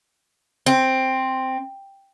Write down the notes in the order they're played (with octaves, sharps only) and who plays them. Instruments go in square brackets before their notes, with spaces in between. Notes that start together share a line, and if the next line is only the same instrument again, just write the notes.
[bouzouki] C4